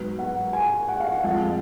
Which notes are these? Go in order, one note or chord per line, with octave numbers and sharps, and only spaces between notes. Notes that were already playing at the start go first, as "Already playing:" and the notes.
Already playing: G#2 F#3 B3
F#5
G#5
F#5
F5
F#5
F2 F3 G#3 F5